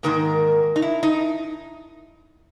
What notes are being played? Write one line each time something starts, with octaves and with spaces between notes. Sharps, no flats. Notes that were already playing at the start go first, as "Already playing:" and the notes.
G#2 D#3 A#3 A#4
D#4
E4
D#4